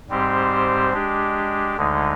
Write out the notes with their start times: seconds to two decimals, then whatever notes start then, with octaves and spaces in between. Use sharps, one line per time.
0.10 G#2 G3 C4 G4 C5
0.93 G#3 D4 G4
1.77 D2 D3 G#3 D#4